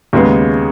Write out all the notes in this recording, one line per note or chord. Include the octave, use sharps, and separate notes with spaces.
D#2 C#3 G#3 B3